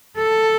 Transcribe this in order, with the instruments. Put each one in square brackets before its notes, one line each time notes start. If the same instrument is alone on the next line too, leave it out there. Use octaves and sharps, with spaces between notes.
[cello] A4